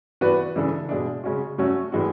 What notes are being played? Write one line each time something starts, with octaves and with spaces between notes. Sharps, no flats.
E3 B3 F#4 B4 D5
C#3 E3 G#3 D4 A4
B2 G#3 D4
C#3 G#3 C#4 F#4
F#3 A3 C#4 F#4
A2 E3 G#3 D4 F#4